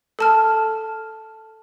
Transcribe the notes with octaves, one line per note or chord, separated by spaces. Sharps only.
A4 A5 F6